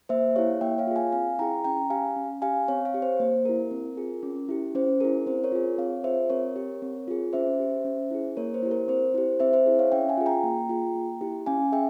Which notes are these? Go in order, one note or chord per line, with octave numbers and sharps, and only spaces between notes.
A#3 C5 E5
E4 G4 C#5 F5
A#3 E5 G5
C#5 F5
F4 G#4
F5 G#5
C4 F5 G#5
E4 G#4 G5 A#5
C#4 G5 A#5
G4 F5 G#5
C#4
G4 F5 G#5
C4 C#5 F5
C#5 F5
G4
C5
A#3 C5
E4 G4 A#4
C4
F4 G#4
C#4
E4 G4
C#4 C5
E4 G#4 A#4
C4 C5
A#4 C#5
F4 G#4
C4 C#5 F5
F4 G#4 C5 E5
C4 A#4 C#5
G4
C4
F4 G#4
C#4 C5 E5
G4
C#4
E4 G#4
A#3 A#4 C#5
C5
E4 G4
A#4
C4 C5
E4 G4 C5
C4 C5 E5
C5 E5
E4 G#4
C#5 F5
C#4 E5 G5
F5 G#5
F4 G#4
G5 A#5
A#3
F4 G#4
A#3
E4 G4
C#4 F5 G#5
G#4 E5 G5